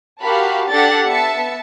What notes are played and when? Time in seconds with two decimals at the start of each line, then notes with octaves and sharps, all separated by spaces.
0.23 F#4 G4 A#4 F5 A5 B5
0.70 D4 G4 A4 F#5 A6
1.06 B3 E5 A5 C#7